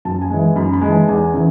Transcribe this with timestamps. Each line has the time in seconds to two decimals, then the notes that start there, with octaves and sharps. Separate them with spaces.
0.05 F#2 A5
0.22 G#5
0.30 E3 G#3
0.56 F#2 B5
0.73 B5
0.81 G#3
0.87 E3 A5
1.08 E2 G#5
1.33 C#3 E3